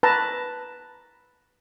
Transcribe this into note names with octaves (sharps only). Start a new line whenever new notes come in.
B4 A5 A#5